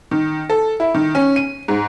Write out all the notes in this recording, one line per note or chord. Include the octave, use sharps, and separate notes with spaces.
D#3
A4
E4
D#3
C#4
D#7
G#2